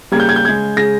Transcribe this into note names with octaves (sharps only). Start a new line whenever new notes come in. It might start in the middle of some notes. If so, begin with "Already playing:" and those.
C#3 G3 A#3 G#6
G6
G#6
G6
C#3 G#3 G#6
C#3 G#3 A#6